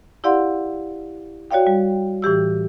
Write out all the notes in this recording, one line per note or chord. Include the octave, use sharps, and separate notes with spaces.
E4 G4 D5 F5 F#5 C6
F#4 C#5 D5 F5 G5
G3
A2 E3 G4 E6